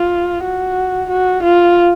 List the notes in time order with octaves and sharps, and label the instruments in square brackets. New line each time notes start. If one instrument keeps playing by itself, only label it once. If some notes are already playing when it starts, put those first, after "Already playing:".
Already playing: [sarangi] F4
F#4
F#4
F4